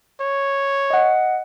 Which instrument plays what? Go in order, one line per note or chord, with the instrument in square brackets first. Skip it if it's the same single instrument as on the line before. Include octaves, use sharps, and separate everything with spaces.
[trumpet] C#5
[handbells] D#5 F#5